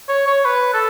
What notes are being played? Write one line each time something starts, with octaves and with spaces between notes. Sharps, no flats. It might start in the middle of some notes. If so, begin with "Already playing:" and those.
C#5
C#5
B4
A4